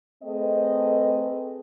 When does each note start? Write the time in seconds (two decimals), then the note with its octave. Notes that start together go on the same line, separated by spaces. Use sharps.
0.23 A3 C4 G#4 B4 D#5